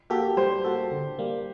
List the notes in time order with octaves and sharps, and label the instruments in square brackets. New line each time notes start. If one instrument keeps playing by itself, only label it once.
[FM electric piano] A#3 F#4 A4 [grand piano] G4
[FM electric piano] G3 [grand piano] C5
[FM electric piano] A#3 F#4 A4
D3
G3 A#3